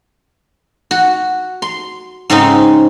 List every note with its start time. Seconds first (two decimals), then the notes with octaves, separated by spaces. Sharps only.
0.91 F#4
1.62 C6
2.30 G#2 C#3 C4 C#4 D#4